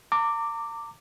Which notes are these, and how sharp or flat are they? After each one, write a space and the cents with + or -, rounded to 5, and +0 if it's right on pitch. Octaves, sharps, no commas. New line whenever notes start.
A#5 -40 D6 +0